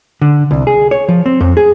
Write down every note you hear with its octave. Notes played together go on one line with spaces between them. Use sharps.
D3
C2
G#4
C#5
F3
C4
F2
G#4